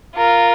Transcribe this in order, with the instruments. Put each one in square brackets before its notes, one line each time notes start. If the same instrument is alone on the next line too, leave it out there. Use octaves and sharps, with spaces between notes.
[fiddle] F4 [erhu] A#4